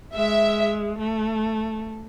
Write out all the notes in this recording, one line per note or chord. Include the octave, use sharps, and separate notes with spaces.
G#3 E5
A3